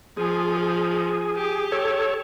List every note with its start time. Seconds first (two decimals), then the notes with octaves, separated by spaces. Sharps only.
0.17 F3 G#4
0.57 G#4
1.35 G4
1.72 A4 C#5